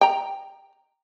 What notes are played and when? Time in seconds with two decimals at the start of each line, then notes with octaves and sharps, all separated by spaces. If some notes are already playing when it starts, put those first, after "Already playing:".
0.01 G5 A#5